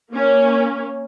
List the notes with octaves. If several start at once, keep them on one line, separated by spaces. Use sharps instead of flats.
A#3 C#4